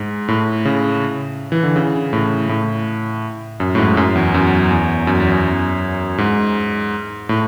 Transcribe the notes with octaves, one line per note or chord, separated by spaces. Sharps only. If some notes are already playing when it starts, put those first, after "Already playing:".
Already playing: G#2
A2
C#3
E3
D3
C#3
A2
A2
F#2
A2
G#2
F#2
E2
F#2
E2
F#2
E2
F#2
G#2
A2